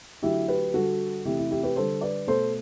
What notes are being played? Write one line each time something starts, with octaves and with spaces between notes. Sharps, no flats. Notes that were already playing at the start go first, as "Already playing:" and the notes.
D3 F#3 A3 E4 G4
G4 B4
D3 G3 F#4 A4
C3 E3 A3 E4 G4
E4
E4 G4
G4 B4
D3 G3 A4 C5
B4 D5
B2 A3 A4 C5